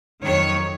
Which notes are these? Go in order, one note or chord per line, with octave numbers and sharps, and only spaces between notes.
F2 D#3 F#3 C#5